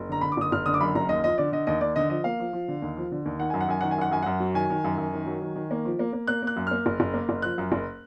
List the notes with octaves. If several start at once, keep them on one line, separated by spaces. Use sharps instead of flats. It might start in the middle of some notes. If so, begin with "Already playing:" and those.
Already playing: F#1
D3 A#5
D3 B5
D6
F#1 D#6
F#1 F6
D3 D#6
D6
F#2 B5
F#1 A#5
D#2 D#5
F3 D#5
D3 D5
D3 D#5
D#2 D#5
D#2 D5
D3 D#5
F3 D#5
A#3 F5
F3
F3
D3
D#2
F3
D3
D#2
D#3 F#5
F#2 G#5
F#5
F#2 G#5
D#3 F#5
G#5
F#2 F#5
F#2 G#5
F#2 F#5
F#3
D#3 G#5
D#3
F#2
F#2
D#3
F#3
D#3
D#3
A#3
F3
A#3
A#3
A#3 F#6
A#3 F#6
F#2
A#3 F6
F#1
F#1
A#3
F#1
F3 F#6
F#2
F#1